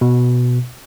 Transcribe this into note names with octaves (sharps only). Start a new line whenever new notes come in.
B2